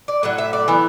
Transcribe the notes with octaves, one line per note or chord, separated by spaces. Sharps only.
D5
A2 F#3 F#5
E5
D5
E3 B3